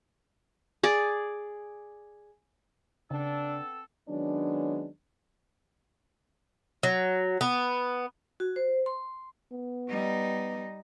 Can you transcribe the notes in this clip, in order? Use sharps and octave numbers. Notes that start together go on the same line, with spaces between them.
G#4 D5
C#3 B3 C4 D4 A4
D#3 F#3 G#3 B3 C#4 D4
F#3
B3
F#4
C5
C6
B3
G3 D#4